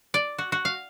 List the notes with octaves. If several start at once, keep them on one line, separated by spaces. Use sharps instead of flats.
D5
F#4
F#4
F5